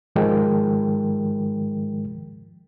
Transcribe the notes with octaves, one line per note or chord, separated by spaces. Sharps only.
G#2 D#3 F3 G#3 A#4 G5